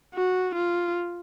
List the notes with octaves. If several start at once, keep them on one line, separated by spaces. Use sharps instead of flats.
F#4
F4